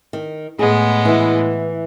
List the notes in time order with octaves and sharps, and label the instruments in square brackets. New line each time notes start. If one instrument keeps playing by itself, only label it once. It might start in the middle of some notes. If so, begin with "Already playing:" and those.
[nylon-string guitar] D#3
[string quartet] A2 G#3 B3 [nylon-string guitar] G#4
[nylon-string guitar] E3 E4